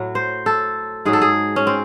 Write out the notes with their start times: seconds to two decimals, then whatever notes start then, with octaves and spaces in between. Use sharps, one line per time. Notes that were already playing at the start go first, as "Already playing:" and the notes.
Already playing: A2 F#3
0.15 C5
0.46 A4
1.05 G#2 F#3 G#4
1.13 A4
1.22 G#4
1.56 C#4
1.67 C4